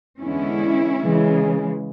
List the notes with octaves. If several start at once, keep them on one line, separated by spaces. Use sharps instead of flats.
E2 D3 G#3 B3 C#4 E4
C#3 E3 G#3